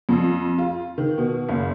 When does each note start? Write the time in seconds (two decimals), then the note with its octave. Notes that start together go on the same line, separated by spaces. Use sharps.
0.09 F2
0.58 F4
0.98 D#3
1.18 B2
1.49 F#1